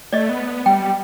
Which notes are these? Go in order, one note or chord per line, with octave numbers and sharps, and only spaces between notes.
A3 D5 D#5
B3
G3 G5